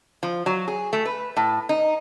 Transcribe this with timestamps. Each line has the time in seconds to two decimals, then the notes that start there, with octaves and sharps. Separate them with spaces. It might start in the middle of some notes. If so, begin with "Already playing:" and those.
0.23 F3
0.46 F#3
0.68 G#4
0.93 A3
1.05 B4
1.37 A2
1.69 D#4